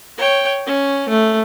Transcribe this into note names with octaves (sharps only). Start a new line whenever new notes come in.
C#5 G5
C#4
A3